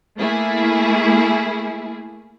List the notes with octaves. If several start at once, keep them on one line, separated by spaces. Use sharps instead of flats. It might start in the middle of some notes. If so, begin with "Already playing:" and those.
A3 A#3 E4 G#4